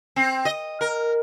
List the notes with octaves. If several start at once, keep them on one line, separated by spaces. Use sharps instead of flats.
C4
D#5
A#4